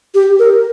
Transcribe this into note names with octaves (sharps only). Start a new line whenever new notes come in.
G4
A#4